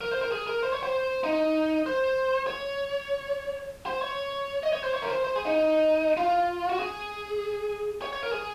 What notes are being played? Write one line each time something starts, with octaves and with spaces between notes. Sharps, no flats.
A#4
C5
A#4
G#4
A#4
C5
C#5
C5
D#4
C5
C#5
C5
C#5
D#5
C#5
C5
C#5
A#4
C5
C5
G#4
D#4
F4
F#4
G#4
C#5
C#5
A#4
G#4